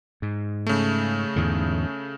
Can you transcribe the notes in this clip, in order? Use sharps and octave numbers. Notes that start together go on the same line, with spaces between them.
G#2
C#3 A3
E2 G#2 D3